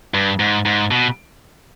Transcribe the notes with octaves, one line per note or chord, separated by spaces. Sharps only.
G2
G#2
G#2
B2